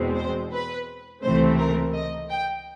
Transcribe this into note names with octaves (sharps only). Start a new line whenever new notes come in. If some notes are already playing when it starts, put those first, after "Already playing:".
Already playing: E2 B2 G#3 C4
C5
B4
C#2 C3 E3 A3 C4 C5
A#4
D#5
G5